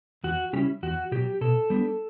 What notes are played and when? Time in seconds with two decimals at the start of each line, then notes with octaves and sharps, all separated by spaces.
0.24 E2 F#4
0.53 C#3 G3 C#4 E4 G4
0.83 E2 F#4
1.12 B2 F#3 G4
1.41 B2 A4
1.70 G3 B3 D4